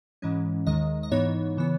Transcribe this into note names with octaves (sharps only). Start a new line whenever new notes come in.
G#2 E3 G#3 C#4
D#2 D#3 G#3 D#5
D#5
G#2 E3 B3 D#4 C#5
C#3 E3 B3